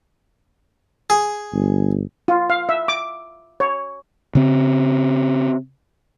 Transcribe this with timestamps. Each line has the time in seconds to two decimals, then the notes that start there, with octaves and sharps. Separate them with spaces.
1.10 G#4
1.53 G1
2.28 F4
2.50 F5
2.69 E5
2.88 D6
3.60 C#5
4.35 C#3 C4